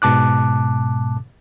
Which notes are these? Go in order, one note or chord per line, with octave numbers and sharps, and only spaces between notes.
G#2 B2 A5 D6 F#6